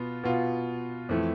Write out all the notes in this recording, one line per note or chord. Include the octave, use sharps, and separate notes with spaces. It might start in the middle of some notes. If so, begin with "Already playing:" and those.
Already playing: B2 B3 F4
B2 B3 F4
F2 E3 A3